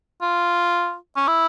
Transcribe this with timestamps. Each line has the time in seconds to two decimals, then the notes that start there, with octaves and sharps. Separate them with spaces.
0.21 F4
1.16 C#4
1.27 E4